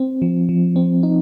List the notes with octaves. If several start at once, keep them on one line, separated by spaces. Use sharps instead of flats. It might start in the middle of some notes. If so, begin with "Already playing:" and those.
Already playing: C4
F3
F3
C4
D#4